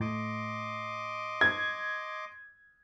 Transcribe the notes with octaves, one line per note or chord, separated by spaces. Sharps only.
A2 D#5 C6 D6
G#6